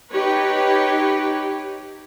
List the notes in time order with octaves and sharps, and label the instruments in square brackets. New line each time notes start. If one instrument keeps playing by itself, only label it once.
[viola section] D#4 G4 B4 C#5